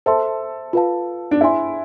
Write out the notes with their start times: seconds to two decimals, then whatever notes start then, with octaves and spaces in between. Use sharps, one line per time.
0.06 A4 C5 E5 A5 C6
0.73 F4 B4 F5 A5
1.31 D4
1.41 E4 G#4 C5 G#5 C6